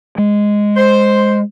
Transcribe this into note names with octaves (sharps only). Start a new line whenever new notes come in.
G#3
C5